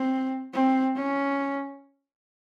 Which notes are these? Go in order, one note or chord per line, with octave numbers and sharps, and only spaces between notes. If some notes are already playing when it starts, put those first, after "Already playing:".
Already playing: C4
C4
C#4